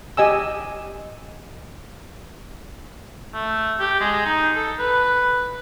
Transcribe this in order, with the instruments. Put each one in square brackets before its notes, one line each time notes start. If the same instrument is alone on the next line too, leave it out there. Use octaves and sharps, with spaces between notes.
[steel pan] G4 D#5 G#5 E6
[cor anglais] A3
G4
G#3
D#4
A4
B4